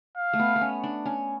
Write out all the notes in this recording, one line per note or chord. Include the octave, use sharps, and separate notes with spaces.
F5
A3
B3
B3
C#4
D4
C#4